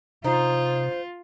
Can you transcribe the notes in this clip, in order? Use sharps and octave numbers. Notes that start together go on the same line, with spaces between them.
C3 D#4 F4 C5